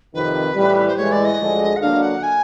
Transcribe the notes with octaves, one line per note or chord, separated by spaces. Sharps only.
F2 C3 D#3 B4
A2 E3 G3
C5
A2 E3 G#3 C#5
D5
D#5
D2 D3 F3 G#3
F#5
D3 F#3 A#3 D4 F5
F#5
G#5